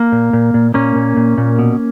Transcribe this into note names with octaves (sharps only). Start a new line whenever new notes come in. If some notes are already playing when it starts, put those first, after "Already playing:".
Already playing: A#3
A#2
A#2
A#2
A#2 A#3 C#4
A#2
A#2
A#2
B2